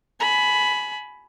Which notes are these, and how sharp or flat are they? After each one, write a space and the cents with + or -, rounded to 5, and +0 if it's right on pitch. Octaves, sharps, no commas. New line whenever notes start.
G#5 +30 B5 +0